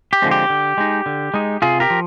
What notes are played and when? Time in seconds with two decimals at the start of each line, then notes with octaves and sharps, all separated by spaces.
0.13 G4
0.22 D3 F3 G#3 C4
0.31 G4
0.50 D3
0.77 G#3 D#4
1.06 D3
1.34 G#3 D#4
1.62 C3 F4 G#4
1.80 G4 A#4
1.90 F3